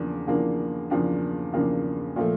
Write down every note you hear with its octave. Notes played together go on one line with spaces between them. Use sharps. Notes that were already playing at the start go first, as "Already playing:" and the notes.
Already playing: E2 C#3 F3 A#3 D4
E2 C#3 F3 A#3 D4
E2 C#3 F3 A#3 D4
E2 C#3 F3 A#3 D4
A#2 F3 A3